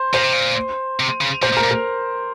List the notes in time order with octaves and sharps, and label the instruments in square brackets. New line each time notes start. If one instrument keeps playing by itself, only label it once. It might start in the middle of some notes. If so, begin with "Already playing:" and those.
Already playing: [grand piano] C5
[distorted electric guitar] A#2 [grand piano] C5
[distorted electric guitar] C3
A#2
C3
C#3
[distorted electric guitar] A#2 [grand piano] C5
[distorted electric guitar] A#2
[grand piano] A#4
[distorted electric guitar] A#2
[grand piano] A#4